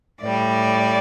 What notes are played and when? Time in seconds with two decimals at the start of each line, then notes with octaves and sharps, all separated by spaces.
0.22 A2 G3 D5